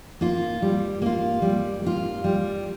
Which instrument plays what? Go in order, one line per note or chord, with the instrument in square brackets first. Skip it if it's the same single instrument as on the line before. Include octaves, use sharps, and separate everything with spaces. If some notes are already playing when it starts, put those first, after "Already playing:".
[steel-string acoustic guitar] A#3 F4
G3
A#3 F4
G3
A#3 F4
G3